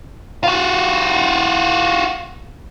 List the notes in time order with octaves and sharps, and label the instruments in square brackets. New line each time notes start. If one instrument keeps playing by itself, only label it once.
[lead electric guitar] F4 F#4